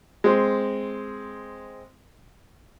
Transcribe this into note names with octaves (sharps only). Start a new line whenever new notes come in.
G#3 C4